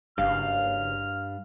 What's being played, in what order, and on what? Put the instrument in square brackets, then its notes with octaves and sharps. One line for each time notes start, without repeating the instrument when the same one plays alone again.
[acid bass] F#1 [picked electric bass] G2 [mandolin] F5 [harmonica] F6